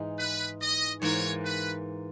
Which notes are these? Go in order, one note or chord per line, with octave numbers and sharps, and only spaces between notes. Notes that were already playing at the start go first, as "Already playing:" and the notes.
Already playing: G#2 E3 D#4 G#4
B4
D#5
G#2 E3 A#3 C#5
B4